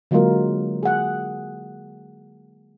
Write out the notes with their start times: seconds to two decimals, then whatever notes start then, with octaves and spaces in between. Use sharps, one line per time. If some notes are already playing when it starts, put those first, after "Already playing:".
0.11 D3 F#3 G#3 A#3 F4 A#4
0.83 G#4 F#5